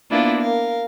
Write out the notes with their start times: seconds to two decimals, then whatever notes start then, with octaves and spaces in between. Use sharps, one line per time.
0.10 A#3 B3 D4 E4 F4
0.40 A#4 F5